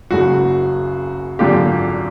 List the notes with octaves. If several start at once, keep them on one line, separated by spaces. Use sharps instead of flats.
F#1 F#2 C#3 F#4
G#1 F#2 D3 F4 G4